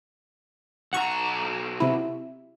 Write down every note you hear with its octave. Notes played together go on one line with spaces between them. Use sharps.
B1 F#5 A#5 C#6
C3 E4